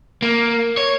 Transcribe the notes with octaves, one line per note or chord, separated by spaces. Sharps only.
A#3
C#5